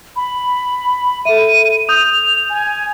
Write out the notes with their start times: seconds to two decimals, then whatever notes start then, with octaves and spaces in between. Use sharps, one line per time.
0.16 B5
1.25 A4 E5 D#7
1.89 D#6 G6 F7
2.50 G#5